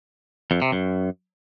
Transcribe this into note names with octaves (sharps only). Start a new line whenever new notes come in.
F2
C3
F#2